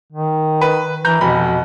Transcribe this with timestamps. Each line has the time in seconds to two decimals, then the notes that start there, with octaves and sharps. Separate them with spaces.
0.13 D#3
0.61 B4
1.05 E3 A#5 G6
1.21 F1 B2 B5